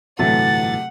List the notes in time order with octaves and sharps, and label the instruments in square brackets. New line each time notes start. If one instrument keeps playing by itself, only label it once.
[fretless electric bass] G1 A2 E3 [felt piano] C3 F#3 A3 [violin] F#5 [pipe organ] A6